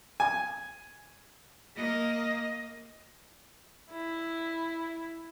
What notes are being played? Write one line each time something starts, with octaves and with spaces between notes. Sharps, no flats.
G#5
A#3 D#5
E4